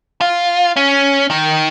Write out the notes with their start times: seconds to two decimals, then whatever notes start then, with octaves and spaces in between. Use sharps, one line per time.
0.21 F4
0.76 C#4
1.30 D#3